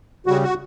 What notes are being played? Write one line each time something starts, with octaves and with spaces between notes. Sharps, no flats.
C#3 G3 F#4
F#4